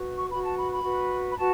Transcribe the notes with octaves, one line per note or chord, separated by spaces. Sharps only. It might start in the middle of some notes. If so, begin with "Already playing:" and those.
Already playing: F#4 B4
C#6
F#4 B4 B5
A5
B5
B5
F#4 B4
B5
F#4 B4 A5